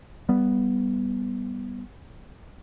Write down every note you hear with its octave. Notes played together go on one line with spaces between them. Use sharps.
G3 B3